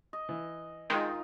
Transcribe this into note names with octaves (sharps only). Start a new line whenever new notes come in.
D#5
E3
D#3 G#3 D#4 F4 G5